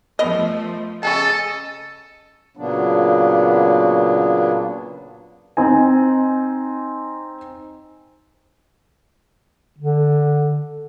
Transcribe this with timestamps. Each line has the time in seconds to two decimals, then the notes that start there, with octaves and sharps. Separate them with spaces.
0.19 F3 A3 B3 A#4 D#5
1.03 C#3 A4 D#5 G#5 A5
2.57 A#2 C#3 F#3 A#3 B3 D4
5.57 C4 D#4 G#5
9.78 D3